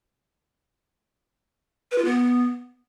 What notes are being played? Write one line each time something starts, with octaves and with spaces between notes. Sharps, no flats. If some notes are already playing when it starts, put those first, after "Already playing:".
B4
F4
B3